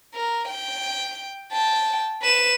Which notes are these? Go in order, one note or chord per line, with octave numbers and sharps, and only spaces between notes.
A#4
G5
G5 A5
B4 E7